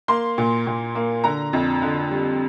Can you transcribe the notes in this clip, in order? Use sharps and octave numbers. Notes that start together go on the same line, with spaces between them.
A#3 C6
A#2
A#2
A#3
D3 A#5
F2
D3
G3